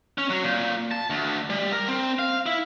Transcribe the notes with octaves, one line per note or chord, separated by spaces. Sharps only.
C#4
F#3
A#2
A5
D2
G3
A#4
C4
F5
E4